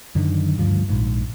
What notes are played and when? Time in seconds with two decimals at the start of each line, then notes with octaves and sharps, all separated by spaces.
0.15 F#2 D3 D#3
0.58 D2 G2 F3
0.90 A#1 G#2